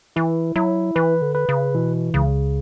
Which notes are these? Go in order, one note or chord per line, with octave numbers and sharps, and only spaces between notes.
E3 E4
F#3 E4
E3 B4
D3
B4
C#3
B2 E3
C#2 C#3